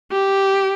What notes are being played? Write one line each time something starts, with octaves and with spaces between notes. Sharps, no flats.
G4